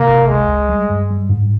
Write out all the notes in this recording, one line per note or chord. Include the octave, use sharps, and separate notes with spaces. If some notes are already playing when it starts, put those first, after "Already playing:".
Already playing: C3 A#3
G1
C#2 G#3
C#2
G3
G2
G3
G#2